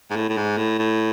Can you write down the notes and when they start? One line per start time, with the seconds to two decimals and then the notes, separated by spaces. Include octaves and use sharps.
0.10 G#2
0.16 A2
0.29 A2
0.37 G#2
0.57 A2
0.79 A2